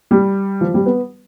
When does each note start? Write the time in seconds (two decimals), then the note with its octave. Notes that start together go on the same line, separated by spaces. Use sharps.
0.11 G3
0.61 F3
0.74 G3
0.86 B3